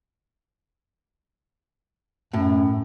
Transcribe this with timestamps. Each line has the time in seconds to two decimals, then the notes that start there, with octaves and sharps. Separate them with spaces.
2.33 F#2 A2